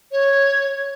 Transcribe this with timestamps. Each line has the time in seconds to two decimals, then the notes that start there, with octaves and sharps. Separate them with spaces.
0.12 C#5